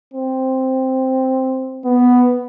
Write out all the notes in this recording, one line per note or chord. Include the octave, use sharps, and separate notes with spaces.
C4
B3